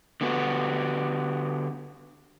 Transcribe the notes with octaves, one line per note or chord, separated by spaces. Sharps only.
D3 B3 F#4